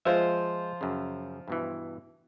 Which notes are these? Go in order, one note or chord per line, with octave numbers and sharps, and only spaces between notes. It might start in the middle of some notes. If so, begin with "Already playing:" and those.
F3 G#3 F4 C5 E5
F#2 C#3
G2 B2 E3